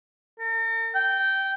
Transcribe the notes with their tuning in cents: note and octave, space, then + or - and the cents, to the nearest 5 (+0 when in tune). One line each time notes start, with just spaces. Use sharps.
A#4 -45
G5 -15